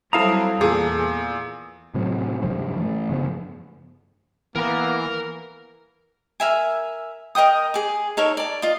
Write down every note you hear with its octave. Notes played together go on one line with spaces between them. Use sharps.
F#3 G3 C4 E4 A4 F5 A#5 D#6
E2 A#2 G#4
A2 C3 F#3
G2 C3 F3 F#3
E3 A3
G2 C#3 F3 B3
E3 A#3 B3 A#4 A#5
A#4 E5 G#5
A#4 D#5 G5 D#6
G#4 D6
D#4 A4 A#4 C#5
D5 A5
F4 D#5